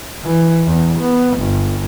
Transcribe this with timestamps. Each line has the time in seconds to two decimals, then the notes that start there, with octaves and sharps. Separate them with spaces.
0.24 E3
0.66 E2
0.99 B3
1.38 G1